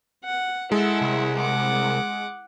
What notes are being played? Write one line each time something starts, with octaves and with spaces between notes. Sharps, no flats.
F#5
G#3 E4 A4 F#5
C2
F#5 D6